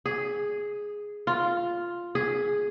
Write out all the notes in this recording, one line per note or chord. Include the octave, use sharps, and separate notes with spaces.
G#4
F4
G#4